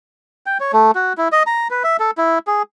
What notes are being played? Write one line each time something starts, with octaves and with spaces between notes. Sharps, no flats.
G5
C#5
A3
F#4
E4
D#5
A#5
B4
E5
A4
E4
G#4